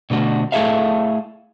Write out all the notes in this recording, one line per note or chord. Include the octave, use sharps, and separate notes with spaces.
B2 D3 A3 F#4
A3 E4 G#4 A4 E5 F5